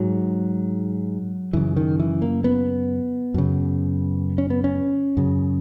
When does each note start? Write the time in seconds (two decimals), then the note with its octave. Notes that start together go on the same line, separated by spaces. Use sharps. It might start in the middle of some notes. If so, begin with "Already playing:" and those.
Already playing: G#2 F#3
1.53 F#2 C#3 E3
1.76 D#3
2.00 E3
2.22 A#3
2.44 B3
3.34 F#2 C#3
4.38 C#4
4.50 B3
4.64 C#4
5.17 F#2 C#3